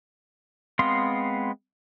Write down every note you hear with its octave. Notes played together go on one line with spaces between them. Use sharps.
G#3 B3 C4 F5 C6